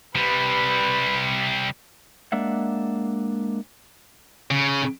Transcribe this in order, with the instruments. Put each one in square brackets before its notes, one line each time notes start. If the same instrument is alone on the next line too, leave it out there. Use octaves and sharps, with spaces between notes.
[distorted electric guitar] C3 G3 [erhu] B4
[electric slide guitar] G#3 A#3 D4 E5 F#5
[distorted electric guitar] C#3